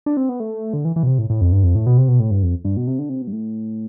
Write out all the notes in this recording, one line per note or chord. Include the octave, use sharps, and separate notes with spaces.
D4
C4
B3
A3
D3
E3
E3
B2
C3
A2
A2
F2
G2
F2
A2
B2
C3
B2
A2
G2
F2
G2
B2
C3
D3
C3
B2
G2
A2